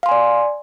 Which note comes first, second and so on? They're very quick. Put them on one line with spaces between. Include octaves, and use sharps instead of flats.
F5 C6 G#5 D5